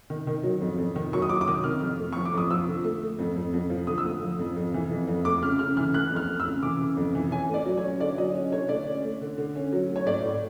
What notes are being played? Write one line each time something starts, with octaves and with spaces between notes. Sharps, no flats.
D#3
D#3
F#3
F2
F2
D#3
F#3 C#6
D#6
F#3 D6
D6
D#3 D#6
C3 F6
F2
A3
F3 C#6
D6
F2 D#6
F3 E6
D3
A3
A3
F2
F2
F2
F3
D3 D#6
E6
A3 D#6
F3
F2
F2
E3
F2
F2
A3 D6
C#3 F6
C#3 F6
E3 F6
A3 F#6
F2
F6
A3
E6
C#3
E3 D6
C#3
F2
E3
C#4 G#5
A3 D5
F#3
C#5
C#4
D3 D5
F#3 D#5
C#4
D3 C#5
A3 D5
C#4
A3
D3
D3
C#4
F#3
A3
C#5
A2 D5
A2